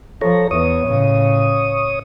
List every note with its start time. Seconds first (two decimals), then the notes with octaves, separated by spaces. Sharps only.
0.21 F3 A4 C#5 A#5
0.51 E2 C#5 D#6
0.86 A2 C#3